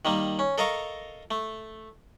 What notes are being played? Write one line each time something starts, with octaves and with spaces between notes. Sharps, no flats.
D#3 G3 A#3
C#4
A4 A#4 D#5 F5 A#5 C#6
A3